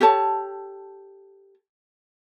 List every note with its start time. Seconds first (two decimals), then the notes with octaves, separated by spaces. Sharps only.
0.01 G4 A4 C#5 A5